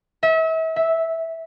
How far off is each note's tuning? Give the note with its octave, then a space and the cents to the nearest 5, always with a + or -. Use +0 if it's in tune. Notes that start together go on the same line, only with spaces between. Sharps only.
E5 -35
E5 -10